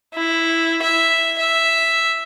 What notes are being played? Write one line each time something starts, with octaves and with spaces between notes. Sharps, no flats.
E4
E5
E5